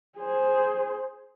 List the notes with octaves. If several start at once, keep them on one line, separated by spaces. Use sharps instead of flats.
G#4 C5